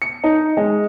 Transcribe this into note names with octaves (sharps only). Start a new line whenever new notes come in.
C#7
D#4
G#3